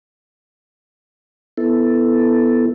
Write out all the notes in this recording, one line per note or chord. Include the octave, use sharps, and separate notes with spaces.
B3 E4 A4